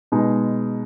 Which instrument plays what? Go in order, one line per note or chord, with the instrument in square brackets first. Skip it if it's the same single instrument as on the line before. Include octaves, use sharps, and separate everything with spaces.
[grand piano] B2 G#3 D#4